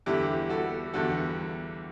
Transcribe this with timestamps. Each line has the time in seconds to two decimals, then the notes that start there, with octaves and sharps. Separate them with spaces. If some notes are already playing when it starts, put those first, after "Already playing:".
0.06 E2 D3 G3 E4 G4
0.49 F#4 A4
0.93 E2 D3 G3 F#4 A4